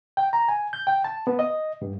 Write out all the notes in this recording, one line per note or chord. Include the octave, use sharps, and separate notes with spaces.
G5
A#5
G#5
G6
G5
A5
B3
D#5
G2